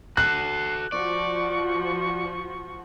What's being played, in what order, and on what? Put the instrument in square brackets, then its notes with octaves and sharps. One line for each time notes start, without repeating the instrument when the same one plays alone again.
[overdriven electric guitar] F#4 A4 [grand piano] F#6 [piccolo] C7
[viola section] F3 F#4 [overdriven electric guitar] D5 [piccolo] C#6